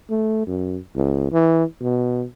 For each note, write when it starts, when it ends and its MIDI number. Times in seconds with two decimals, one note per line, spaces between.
0.10 0.44 57
0.47 0.78 42
0.96 1.28 37
1.32 1.64 52
1.82 2.25 47